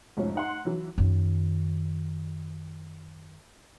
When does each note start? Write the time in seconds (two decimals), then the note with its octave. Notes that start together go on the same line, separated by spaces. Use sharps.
0.17 F1 G#2 F3 C#4
0.35 D#4 F#5 C6
0.65 E3 F#3
0.98 F#2 D#3